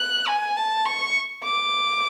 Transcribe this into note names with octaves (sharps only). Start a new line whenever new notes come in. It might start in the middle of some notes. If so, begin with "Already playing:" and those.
Already playing: F#6
G#5
A5
C#6
D6